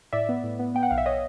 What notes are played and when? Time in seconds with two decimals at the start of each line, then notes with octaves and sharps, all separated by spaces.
0.13 A2 D5 E5
0.29 B3
0.44 A2
0.59 B3
0.74 B3 G5
0.83 F#5
0.91 B1 F5
0.98 E5
1.06 C#5 D#5